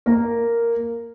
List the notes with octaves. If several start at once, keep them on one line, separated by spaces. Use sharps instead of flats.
A#3 A#4